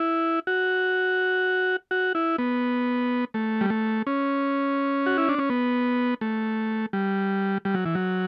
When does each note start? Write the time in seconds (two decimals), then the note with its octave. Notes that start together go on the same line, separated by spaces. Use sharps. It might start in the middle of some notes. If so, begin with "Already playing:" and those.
Already playing: E4
0.47 F#4
1.91 F#4
2.15 E4
2.38 B3
3.34 A3
3.61 G3
3.70 A3
4.07 C#4
5.06 F#4
5.18 E4
5.29 D4
5.39 C#4
5.50 B3
6.21 A3
6.93 G3
7.65 G3
7.74 F#3
7.86 E3
7.95 F#3